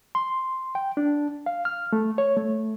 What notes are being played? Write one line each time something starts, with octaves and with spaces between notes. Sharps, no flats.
C6
G5
D4
F5
F6
A3
C#5
A3